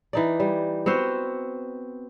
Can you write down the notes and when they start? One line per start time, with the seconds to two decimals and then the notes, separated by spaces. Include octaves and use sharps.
0.13 E3 D#4 D5
0.40 G3
0.86 B3 C4 F#4 C5